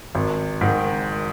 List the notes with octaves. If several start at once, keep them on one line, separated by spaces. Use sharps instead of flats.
G#1
G#2 D#3